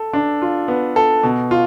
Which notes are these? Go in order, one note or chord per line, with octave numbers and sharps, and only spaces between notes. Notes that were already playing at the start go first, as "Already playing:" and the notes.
Already playing: A4
D4
F4
B3
A4
B2
F4